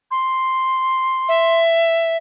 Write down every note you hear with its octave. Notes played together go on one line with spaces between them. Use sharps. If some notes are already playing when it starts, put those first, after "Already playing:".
C6
E5